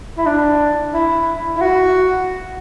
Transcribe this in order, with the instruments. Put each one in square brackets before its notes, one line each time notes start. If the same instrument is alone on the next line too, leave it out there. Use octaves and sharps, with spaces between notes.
[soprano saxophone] E4
D4
E4
E4
F#4